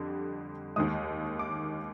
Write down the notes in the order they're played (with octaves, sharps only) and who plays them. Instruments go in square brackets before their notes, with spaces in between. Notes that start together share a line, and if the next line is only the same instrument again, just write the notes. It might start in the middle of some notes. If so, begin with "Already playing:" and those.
Already playing: [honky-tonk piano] F2 D3 G3
D#2 D#3 G#3 D#6
D6